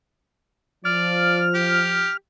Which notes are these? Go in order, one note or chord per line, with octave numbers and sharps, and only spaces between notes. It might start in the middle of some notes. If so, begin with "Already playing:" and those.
F3 D5 F6
G4